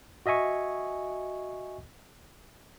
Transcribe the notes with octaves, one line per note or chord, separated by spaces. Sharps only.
F#4 D#5 E5 G#5 C#6